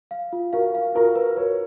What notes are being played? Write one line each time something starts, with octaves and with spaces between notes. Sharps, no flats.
F5
F4
F#4 A#4 F5
F5
F4 F#4 A#4
B4
A#4 B4 C#5